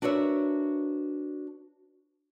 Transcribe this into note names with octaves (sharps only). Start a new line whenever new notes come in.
D4 F#4 A#4 B4 C#5 E5